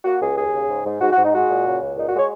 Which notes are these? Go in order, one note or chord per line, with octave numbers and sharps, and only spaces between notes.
A#3 F#4
C#2 G#4
D#2 G#4
C#3
G#2
G#2
G#2 F#4
F#4
G#2
D#4
G#3 F#4
A#2
C#3
C#2
A#2 D#4
F#4
G#3 C#5